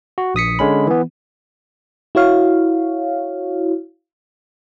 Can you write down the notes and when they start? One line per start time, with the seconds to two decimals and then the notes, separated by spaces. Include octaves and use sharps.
0.18 F#4
0.35 A#1 D#6 B6 C#7
0.59 D3 G#3 C#4 B5
0.87 E3 B3
2.15 E4 F#4 C#5 F5